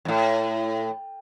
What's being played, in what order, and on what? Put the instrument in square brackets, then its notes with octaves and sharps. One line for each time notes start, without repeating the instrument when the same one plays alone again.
[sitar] F2 A2